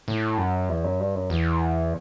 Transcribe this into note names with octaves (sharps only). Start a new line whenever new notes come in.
A2
F#2
E2
F#2
G2
F#2
E2